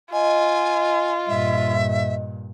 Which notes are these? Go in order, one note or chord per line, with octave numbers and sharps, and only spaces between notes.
F4 D#5 G#5
G2 A#2 E5